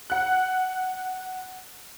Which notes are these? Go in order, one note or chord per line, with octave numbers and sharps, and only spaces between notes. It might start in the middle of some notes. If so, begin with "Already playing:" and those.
F#5 F#6